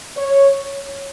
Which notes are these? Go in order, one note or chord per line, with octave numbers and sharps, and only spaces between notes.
C#5